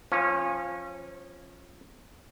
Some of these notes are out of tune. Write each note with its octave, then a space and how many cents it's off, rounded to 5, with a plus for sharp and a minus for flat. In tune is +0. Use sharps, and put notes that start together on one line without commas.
F3 +0 C#4 -25 F4 +0